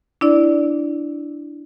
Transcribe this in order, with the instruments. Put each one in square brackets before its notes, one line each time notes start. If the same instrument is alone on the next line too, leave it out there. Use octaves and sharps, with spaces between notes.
[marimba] D4 E4 D5